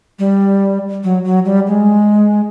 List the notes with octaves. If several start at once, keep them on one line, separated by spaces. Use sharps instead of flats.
G3
F#3
F#3
G3
G#3